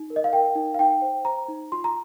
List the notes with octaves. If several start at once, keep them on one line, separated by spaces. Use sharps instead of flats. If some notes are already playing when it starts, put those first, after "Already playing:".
Already playing: D#4
A#4
D#5
F5
A#4 G5
D#4
F5
D#4 G5
C5
C5 A#5
D#4
F4 C6
A#5